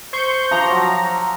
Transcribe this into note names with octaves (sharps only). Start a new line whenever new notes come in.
C5 C#6 G6
F3 A5 A#5 D6
F#3